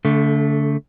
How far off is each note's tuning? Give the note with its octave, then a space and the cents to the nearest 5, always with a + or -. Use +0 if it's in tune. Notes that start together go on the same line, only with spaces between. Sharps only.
D3 -35 A3 +0